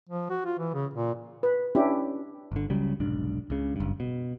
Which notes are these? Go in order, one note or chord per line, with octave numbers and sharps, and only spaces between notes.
F3
F#4
F4
E3
C#3
A#2
B4
C#4 D4 E4 G4
G1 D3
C#2 C#3 F#3 G3
F1 B1 G#2 D4
C#2 C#3
F#1 G2
B2